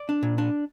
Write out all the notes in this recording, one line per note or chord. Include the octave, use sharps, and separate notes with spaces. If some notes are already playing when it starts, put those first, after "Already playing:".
Already playing: D5
D4
A#2
D4